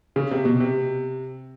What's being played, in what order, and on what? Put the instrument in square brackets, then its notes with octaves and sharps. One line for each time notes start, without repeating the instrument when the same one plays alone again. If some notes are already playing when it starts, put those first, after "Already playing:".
[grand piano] C#3
C3
B2
C3